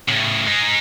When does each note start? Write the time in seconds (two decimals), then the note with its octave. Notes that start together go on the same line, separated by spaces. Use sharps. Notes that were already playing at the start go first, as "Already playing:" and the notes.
0.08 A2 C#3
0.46 G#3 D#4